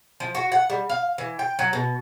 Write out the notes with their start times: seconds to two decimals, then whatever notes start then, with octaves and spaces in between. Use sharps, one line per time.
0.20 F3
0.35 F#4
0.52 F#5
0.70 G3
0.90 F5
1.18 E3
1.39 G5
1.59 F#3
1.73 B2